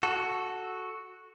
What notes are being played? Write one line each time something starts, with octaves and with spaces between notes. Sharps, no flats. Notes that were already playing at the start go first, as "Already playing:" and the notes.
F#4 A4